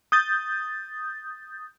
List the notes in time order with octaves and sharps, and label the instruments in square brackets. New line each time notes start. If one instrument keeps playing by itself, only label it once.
[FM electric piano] D#6 G6 A6